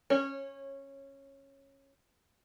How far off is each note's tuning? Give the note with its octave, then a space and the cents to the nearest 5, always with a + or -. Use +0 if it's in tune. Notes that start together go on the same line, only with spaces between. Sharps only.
C#4 -15 C#5 -25